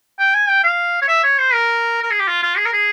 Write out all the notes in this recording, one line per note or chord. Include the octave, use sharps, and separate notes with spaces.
G5
G#5
G5
F5
C#5
E5
C#5
C5
A#4
A#4
G#4
G4
F4
F4
G#4
A#4
G#4